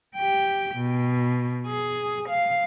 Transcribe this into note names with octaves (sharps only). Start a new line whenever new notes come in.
G4 G5
B2
G#4
F5